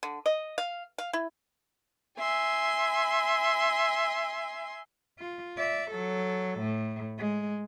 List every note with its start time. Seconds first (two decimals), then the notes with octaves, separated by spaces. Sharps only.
0.03 D3
0.26 D#5
0.58 F5
0.98 F5
1.13 E4
2.19 E5 G#5 C6
5.19 F4
5.58 D5 E5
5.91 F#3 A4
6.60 A2
7.18 G#3